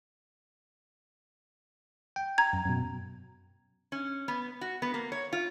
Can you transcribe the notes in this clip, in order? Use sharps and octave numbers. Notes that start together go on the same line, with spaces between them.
G5
A#5 G#6
F#2
F#2 B2
C#4
B3
F#4
B3
A#3
C#5
F4